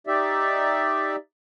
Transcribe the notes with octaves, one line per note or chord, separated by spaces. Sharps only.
D#4 G4 D5 E5